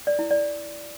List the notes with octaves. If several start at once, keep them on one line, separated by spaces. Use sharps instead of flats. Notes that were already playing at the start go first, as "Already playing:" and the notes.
D5
E4
D5